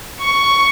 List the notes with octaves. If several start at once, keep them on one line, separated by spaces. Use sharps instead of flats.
C#6